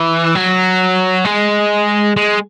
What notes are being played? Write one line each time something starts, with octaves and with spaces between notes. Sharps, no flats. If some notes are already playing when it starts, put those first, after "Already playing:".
Already playing: E3
F#3
G#3
G#3